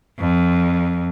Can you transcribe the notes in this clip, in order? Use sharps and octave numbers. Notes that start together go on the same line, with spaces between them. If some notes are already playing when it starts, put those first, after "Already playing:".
F2